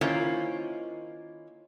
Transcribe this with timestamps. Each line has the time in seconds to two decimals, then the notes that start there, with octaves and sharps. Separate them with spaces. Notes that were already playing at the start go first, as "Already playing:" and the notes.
0.01 D#3 A#3 C#4 E4 F4 C5